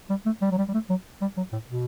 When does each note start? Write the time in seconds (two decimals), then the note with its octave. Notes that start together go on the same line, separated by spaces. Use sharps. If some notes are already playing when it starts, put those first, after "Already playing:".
0.10 G3
0.26 A3
0.42 G3
0.51 F#3
0.58 G3
0.68 G3
0.74 A3
0.90 F#3
1.21 G3
1.37 F#3
1.53 A2
1.69 B2